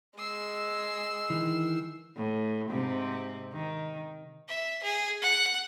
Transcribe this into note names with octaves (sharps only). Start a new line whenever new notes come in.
G#3 E6 C7
D#3 E3
A2
G#2 C3 C4
D#3
E5
G#4
F#5